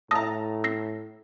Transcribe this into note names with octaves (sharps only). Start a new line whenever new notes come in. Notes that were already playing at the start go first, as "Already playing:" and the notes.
A2 A5 A#5 D#6 E6 A#6
E6 A#6 C7